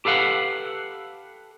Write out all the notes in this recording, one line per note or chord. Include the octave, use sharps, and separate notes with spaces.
G4 A4 B4 F5 F#5